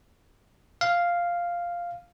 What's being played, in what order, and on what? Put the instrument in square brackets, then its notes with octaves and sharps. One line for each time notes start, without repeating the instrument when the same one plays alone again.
[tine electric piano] F5